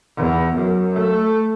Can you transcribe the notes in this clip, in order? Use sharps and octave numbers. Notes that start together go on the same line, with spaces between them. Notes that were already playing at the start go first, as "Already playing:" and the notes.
E2
F#2
A3